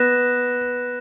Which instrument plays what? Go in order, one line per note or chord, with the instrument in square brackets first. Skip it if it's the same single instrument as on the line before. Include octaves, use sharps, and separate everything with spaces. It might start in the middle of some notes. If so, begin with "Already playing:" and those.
Already playing: [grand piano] B3 [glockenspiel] F#6 A#6 E7